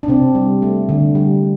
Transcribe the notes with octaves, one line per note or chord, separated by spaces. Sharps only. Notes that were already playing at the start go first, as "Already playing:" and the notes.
D4
C3 C4
G3
A3
D3
G3